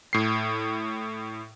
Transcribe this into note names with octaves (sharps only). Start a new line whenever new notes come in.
A2 C7